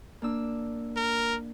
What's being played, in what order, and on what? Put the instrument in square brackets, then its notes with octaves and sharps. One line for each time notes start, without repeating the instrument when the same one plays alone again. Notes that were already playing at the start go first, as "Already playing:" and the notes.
[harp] A#3 D4 E6
[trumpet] A#4